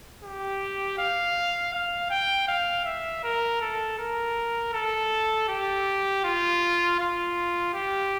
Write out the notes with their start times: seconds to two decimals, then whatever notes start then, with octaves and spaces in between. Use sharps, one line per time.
0.23 G4
0.98 F5
1.73 F5
2.10 G5
2.48 F5
2.85 E5
3.23 A#4
3.61 A4
3.99 A#4
4.73 A4
5.48 G4
6.24 F4
7.00 F4
7.74 G4